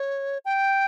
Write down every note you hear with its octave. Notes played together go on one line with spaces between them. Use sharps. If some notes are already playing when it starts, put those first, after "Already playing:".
Already playing: C#5
G5